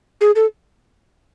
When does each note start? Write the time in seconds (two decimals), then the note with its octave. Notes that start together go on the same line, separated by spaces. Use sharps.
0.21 G#4
0.35 A4